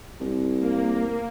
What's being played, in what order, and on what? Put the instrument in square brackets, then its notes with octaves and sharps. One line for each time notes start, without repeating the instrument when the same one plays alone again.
[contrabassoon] C2
[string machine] A#3